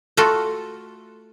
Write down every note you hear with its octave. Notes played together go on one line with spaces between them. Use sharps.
A3 F4 F#4 A4